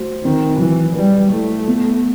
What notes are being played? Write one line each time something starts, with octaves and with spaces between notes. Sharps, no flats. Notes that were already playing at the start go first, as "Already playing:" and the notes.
Already playing: A3 F#4 C5
D#3 C4
E3 F#3
G3 B4
A3 E4
B3